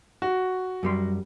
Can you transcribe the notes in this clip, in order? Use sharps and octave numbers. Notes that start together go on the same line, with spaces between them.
F#4
F#2 G3 C6